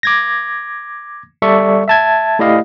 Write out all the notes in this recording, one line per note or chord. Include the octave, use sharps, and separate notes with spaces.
D6 G#6 A#6
G3 A4 D5 E5 C#6
E5 A5 G#6
A3 E4 G4 D5 D#5 F5